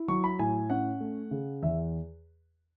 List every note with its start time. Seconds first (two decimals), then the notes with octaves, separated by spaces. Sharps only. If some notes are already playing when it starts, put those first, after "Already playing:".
Already playing: E4
0.08 F#3 C#6
0.24 B5
0.39 A2 G#5
0.70 C#4 F#5
1.00 A3
1.31 C#3
1.62 E2 E5